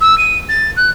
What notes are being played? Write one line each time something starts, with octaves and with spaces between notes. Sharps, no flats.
E6
D#7
A6
F#6